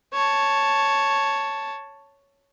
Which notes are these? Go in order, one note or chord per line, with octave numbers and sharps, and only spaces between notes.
C#5 A5